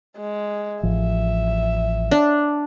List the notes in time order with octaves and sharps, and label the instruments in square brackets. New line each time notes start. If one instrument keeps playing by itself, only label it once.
[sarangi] G#3
[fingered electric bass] A1 F3 [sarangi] E5
[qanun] D4